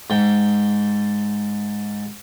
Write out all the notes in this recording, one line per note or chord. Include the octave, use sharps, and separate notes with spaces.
G#2 G5